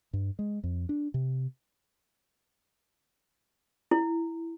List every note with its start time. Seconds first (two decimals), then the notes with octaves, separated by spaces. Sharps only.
0.13 G2
0.39 G#3
0.64 F2
0.89 D4
1.14 C3
3.91 E4